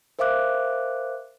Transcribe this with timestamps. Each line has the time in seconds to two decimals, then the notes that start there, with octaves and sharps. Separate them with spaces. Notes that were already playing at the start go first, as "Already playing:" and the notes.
0.19 A#4 C5 E5 F5 D6 F#6